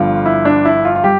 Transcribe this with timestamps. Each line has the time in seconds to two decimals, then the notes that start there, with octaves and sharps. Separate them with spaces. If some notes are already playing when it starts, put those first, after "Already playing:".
Already playing: G1 G2 D3 F3 F4
0.25 E4
0.45 D4
0.65 E4
0.85 F4
0.95 F4
1.04 G3 G4